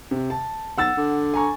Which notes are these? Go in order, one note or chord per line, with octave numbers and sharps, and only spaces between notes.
C3
A5
B1 F#5 E6 A6
D3
G#5 A#5 C#6